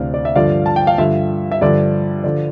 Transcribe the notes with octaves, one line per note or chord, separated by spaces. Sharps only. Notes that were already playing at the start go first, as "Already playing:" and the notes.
Already playing: D2 C3 E3 D5 F5
D5
E5
G2 D3 F3 D5 F5
A5
G5
F5
G2 D3 F3 E5
E5
G2 D3 F3 D5
D3 F3 D5